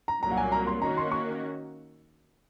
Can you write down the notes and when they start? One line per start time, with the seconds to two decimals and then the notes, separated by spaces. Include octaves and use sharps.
0.08 A#5
0.23 C2 A#2 F#3 A#3 A#5
0.32 F#5
0.37 G#5
0.52 A#5
0.67 C6
0.82 D#3 A#3 C#4 F#4 A#5
0.97 C6
1.12 C#6